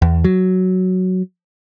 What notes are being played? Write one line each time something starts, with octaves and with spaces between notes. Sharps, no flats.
E2
F#3